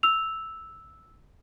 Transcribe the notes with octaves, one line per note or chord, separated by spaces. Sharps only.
E6 F7